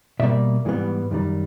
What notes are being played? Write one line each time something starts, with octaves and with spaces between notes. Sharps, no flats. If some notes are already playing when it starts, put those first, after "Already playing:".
B2 G3 A#3 D5 E5
G#2 E3 G3 B3
F#2 D#3 G3